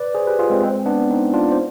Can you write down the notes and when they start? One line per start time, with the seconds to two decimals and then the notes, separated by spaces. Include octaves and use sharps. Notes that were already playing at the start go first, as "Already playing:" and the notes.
Already playing: B4 D5
0.15 G#4 C5
0.27 G4 B4
0.39 F4 G#4
0.50 G#3 C4
0.63 G#3 C4
0.86 B3 D4
1.09 C4 D#4
1.34 D4 F4
1.52 C5